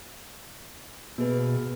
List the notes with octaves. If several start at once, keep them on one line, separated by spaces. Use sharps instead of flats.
B2 A#3 G#4 B4